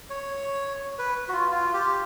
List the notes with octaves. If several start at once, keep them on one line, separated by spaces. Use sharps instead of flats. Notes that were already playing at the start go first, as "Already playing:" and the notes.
C#5
B4
F#4
F4
F4
G4